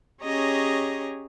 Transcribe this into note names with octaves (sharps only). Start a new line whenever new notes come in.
C#4 G4 G#4 C#5 D#5 A#5